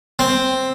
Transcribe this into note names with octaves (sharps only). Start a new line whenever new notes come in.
C4